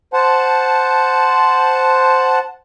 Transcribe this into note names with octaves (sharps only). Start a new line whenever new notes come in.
C5 F#5 A5